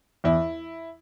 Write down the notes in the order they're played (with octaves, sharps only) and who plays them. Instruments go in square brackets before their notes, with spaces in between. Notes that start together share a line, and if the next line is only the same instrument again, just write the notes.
[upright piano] E2 E4